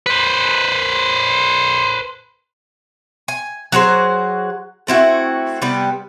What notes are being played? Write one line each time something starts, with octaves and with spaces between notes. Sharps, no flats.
B4 C5
G#5
F#3 F#4 G#4 C5
A3 C4 E4 F#4
C3 G3 B3 B4